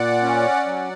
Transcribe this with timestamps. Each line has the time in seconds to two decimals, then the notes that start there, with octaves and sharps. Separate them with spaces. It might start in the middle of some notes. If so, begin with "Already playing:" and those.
Already playing: A#2 D5 F#5
0.23 C#4
0.66 F#3